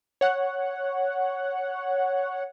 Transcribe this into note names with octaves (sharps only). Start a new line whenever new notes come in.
C#5 F#5